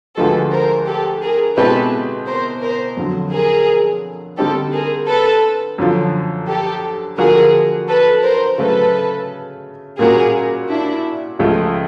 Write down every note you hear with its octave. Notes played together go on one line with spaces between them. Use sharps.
D2 D3 F3 G#3 A4 B4
A#4 C5
G4 A4
G#4 A#4
B2 G#3 C4 E4 G4 A4 B4
A#4 C5
A#4 C5
F2 D3 F#3
G#4 A#4
D3 G3 C4 D#4 G4 A4
G#4 A#4
A4 B4
F#2 D3 F3
G4 A4
D3 F3 A#3 D4 F#4 G#4 A#4
A4 B4
A#4 C5
C#3 F#3 A3 A4 B4
A#2 G3 A#3 C#4 F#4 G#4 A#4
D4 E4
C#2 C#3 F3 A3